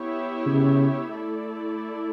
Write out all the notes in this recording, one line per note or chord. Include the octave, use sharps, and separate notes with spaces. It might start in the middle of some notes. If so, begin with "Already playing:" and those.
Already playing: B3 E4 G4 C#5 E5
C#3
A3 E4 A4 D5